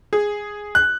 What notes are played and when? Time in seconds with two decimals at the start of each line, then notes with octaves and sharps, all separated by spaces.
0.13 G#4
0.75 F#6